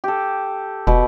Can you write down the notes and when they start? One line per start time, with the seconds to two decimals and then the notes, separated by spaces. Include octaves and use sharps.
0.04 G4 A4
0.87 E1 B2